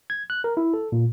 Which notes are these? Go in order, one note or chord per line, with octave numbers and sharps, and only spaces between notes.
G#6
F#6
A#4
E4
A4
A#2